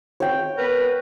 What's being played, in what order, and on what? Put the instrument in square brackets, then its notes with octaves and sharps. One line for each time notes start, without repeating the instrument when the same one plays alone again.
[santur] C#5 G5
[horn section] B3 A#4 B4